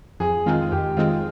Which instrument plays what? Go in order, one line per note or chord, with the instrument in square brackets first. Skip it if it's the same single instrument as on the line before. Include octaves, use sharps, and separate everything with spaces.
[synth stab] F2 [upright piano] G#4
[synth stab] D#3 G#3 C4 [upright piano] F4
[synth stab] F2 [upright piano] G4
[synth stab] D#3 G#3 C4 [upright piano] F4